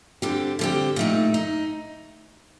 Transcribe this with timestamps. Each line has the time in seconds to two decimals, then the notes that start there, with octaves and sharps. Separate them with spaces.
0.22 D3 G3 C4 G4
0.59 D3 G3 C4 G4
0.96 A#2 A3 D#4
1.34 D#4